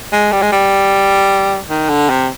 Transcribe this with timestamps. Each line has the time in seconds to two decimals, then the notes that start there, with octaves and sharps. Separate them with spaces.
0.13 G#3
0.32 G3
0.42 G#3
0.52 G3
1.70 D#3
1.89 D3
2.10 C3